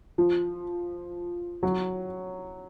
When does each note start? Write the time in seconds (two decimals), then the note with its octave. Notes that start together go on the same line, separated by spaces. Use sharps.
0.18 F3
1.63 F#3